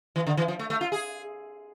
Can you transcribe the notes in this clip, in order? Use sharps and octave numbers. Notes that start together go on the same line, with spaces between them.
E3
D3
E3
F3
A3
A3
F4
G#4